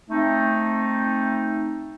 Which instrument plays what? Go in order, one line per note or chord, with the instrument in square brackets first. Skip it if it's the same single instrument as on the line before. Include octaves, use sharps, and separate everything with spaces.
[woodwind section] A3 C4 D#4